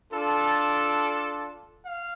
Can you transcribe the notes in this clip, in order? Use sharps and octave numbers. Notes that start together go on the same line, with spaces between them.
D4 F4 A4
F5